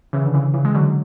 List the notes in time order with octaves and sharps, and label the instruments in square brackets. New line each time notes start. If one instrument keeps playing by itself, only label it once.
[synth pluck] C#3 E3
D3
C#3 E3
C#3 E3
G#3
D3 F#3